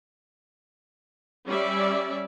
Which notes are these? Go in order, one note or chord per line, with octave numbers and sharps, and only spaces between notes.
G3 C#4 D5 E5